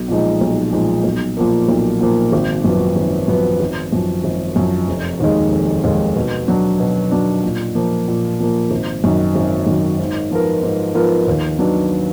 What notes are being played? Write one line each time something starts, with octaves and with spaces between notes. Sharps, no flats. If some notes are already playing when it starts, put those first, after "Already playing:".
Already playing: B1
A#2 F3 G#3 D#4
B1
A#2 F3 G#3 D#4
B1
A#2 F3 A#3
B1
A#2 F3 A#3
G#1
F#2 F3 B3
G#1
F#2 F3 B3
G#1
F#2 F3
G#1
F#2 F3
F1
D#2 D#3 G#3
F1
D#2 D#3 G#3
B2
F#3 D4
B2
F#3 D4
A#2
F3 A#3
A#2
F3 A#3
G#1
F#2 D#3
G#1
F#2 D#3
G#2
F3 B3 F4 A#4
G#2
F3 B3 F4 A#4
D#2
D#3 F#3 B3 D4